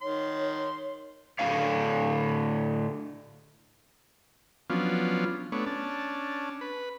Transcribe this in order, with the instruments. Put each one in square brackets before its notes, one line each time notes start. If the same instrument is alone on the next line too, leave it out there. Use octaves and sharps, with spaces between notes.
[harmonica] D#3 C6 [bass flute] C#5
[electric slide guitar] A2 D3 D#4 C#5 F5
[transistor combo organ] F3 F#3 B3 C#4 D4 F4
A3 B3 D4 C#5
C#4 D4 A5
B4